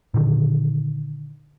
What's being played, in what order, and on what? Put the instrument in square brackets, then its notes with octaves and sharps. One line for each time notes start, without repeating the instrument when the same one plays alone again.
[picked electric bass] A#2 D3 D#3